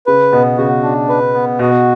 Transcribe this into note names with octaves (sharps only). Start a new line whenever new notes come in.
C#3 B4
B2 B3
C#3 F#4
D4
B4
B3
B2 F#4